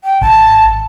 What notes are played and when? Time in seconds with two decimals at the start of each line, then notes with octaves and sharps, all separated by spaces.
0.04 G5
0.21 G#1 A5